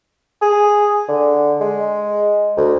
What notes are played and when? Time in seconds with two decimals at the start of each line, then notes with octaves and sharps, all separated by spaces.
0.42 G#4
1.08 D3
1.61 G#3
2.57 D2